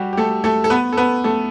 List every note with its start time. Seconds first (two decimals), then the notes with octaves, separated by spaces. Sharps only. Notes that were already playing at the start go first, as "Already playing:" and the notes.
Already playing: G3 F#4 G4
0.13 G4
0.17 A3 A4
0.44 A3 A4
0.64 A4
0.70 B3 B4
0.93 A4
0.97 B3 B4
1.24 A3 A4